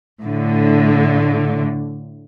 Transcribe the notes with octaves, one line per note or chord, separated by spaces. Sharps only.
A2 D3